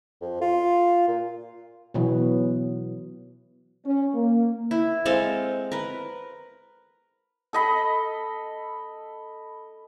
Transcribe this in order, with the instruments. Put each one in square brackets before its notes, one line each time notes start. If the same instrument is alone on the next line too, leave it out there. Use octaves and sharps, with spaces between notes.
[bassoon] F2
F4
A#2
[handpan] B2 E3 F#3 B3
[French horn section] C#4
A#3
[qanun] E4
G#3 C4 A4 F5
A#4 B4
[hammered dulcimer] A4 D#5 B5